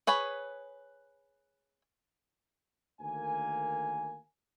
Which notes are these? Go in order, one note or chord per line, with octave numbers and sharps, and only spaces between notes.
G#4 B4 C#5 B5
D2 D#3 A#3 G#5